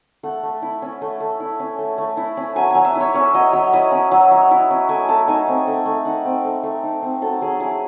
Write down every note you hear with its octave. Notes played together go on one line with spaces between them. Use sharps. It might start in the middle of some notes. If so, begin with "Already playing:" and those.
A3 F#5
A3
E4
C#4
A3
A3
E4
C#4
A3
A3
E4
C#4
F#3 G#5
F#3 G#5
E5
E4 C#5
C#4 C#5
F#3 D#5
F#3 C#5
E4 D#5
C#4
F#3
F#3
E4
C#4
A3 G#5
A3 A5
D#4 G#5
C4
A3
A3
D#4 F#5
C4
A3
A3
D#4
C4
F#3 A4
F#3 G#4
E4 G#4